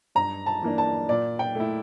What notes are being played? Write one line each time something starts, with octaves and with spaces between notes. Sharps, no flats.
G2 A#5
A5
E3 A#3 D4
A5
A#2 D5
G5
A3 E4